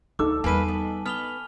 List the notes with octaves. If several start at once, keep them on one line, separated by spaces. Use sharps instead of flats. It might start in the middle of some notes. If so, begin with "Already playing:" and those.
D2 D#4 A4 D6 E6
E2 G3 A#3 B4 G#5 A5 D#7
B3
B3 F6 F7 G7